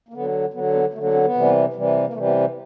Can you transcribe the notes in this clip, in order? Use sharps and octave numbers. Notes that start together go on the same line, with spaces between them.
A#3
D3 F#3 B3
D3 F#3 B3
B3
D3 F#3 A3
A#3
C4
B3
C3 E3 G3
C3 E3 G3
A#3
C3 E3 G3 A3
B3
C4